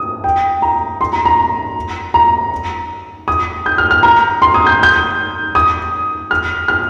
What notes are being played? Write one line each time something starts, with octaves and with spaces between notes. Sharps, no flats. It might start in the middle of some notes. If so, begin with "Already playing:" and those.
Already playing: D#6
G5
A#5
C6
A#5
A#5
A#5
D#6
G6
F6
F6
A#5
C6
D#6
G6
G6
D#6
F6
F6